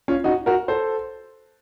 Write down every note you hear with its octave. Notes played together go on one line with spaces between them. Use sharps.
C#4 F4
D#4 F#4
F#4 A#4
A4 C5